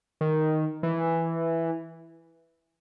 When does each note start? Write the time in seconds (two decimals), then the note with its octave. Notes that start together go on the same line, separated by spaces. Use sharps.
0.21 D#3
0.83 E3